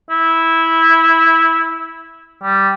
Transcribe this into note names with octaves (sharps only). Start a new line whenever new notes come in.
E4
G3